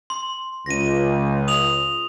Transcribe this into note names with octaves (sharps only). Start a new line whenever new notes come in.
C6
C#2 A#6 D#7
D#6 F7 F#7